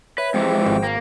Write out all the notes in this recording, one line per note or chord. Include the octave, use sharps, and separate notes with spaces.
B4 C#5 E5
F2 C3 E3 G#3 C5 G5
G#1
A#3